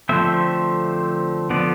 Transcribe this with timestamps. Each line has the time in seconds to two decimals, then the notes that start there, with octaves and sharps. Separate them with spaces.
0.09 D3 F3 A3 C4 E5
1.50 D3 F3 B3 D5